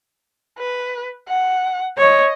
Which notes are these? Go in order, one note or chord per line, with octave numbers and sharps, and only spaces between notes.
B4
F#5
C#5 D#5